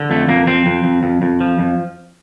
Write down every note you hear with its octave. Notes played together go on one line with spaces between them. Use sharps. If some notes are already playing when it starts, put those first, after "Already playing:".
Already playing: D3
F2 A3
F2 A#3
F2 C4
F2
F2
F2
F2
F3
F2